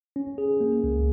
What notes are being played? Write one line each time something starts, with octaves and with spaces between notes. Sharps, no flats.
C#4
G#4
A#3
C#2